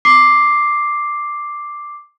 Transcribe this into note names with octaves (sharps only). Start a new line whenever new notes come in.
D6 C7